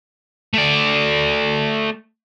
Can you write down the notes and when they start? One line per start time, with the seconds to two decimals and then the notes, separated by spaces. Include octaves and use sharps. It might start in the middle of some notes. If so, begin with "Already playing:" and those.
0.54 A3 D5